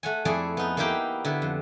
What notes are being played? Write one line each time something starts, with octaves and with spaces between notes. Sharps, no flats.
A3 F#5 G#5
F2 A3 E4 G#4 D5
B3 D#4
A#3 B3 D#4 E4 G4 G5
D3 B3 E4
F2